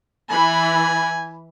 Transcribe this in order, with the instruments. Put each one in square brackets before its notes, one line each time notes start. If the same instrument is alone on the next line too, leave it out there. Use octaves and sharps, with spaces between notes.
[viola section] E3 B5 [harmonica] G#5